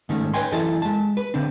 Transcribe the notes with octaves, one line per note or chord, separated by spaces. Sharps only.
G#2 D#3 A3 C#4
B4 C#5 D#5 G5 G#5 C6
F#2 E3 E4 A4 D#5 A5
G#3 A5
B4
D3 C4 D4